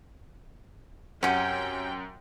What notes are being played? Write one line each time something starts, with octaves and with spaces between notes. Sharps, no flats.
F#2 C3 C#4 F#5 G5